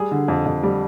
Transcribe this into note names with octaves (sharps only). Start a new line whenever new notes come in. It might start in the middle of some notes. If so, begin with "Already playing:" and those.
Already playing: G3 G#4
D3
F2
F2
G3